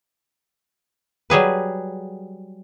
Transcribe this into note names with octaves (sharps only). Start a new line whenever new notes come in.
F#3 G3 G#4 B4